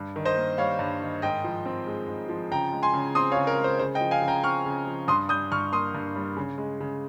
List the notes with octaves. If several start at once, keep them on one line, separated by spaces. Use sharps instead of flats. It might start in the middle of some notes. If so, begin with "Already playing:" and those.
Already playing: G2
D#3
C5 D#5
A#3
G3 C#5 F5
G2
D#3
G#2 D#5 G5
F3
C4
G#3
G#2
F3
C#3 G5 A#5
G#3
G#5 C6
C#3
C4 C6 D#6
C#5 F5
C#3
A#4 C#5
G#3
C5
C#3 C5
D#5 G5
F3
F5 G#5
C#3
G5 A#5
C4 C#6 F6
C#3
F3
G2 C6 D#6
G3 D#6 G6
G2 C#6 F6
A#3 C6 D#6
G2
G3
C#3
G#3
C#3